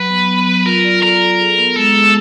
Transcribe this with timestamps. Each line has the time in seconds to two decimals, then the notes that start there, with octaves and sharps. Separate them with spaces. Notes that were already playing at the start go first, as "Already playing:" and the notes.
Already playing: F#3 B4
0.10 B3
0.29 B3
0.47 F#3
0.65 F4 A#4
0.84 D5
1.02 A4 A#4
1.21 A4
1.40 G#4
1.58 B3
1.76 G#3 A4
1.95 G#4